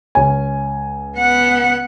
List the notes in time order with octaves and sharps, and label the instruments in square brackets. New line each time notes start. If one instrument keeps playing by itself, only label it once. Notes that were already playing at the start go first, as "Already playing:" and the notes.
[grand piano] C#2 C#4 G#5
[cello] B3 F#5